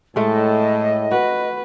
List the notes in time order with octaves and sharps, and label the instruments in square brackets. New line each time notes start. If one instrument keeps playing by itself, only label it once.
[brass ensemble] A2 [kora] G#3 A3 [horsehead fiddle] A4 [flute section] D#5
[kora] F#4 [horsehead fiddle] B4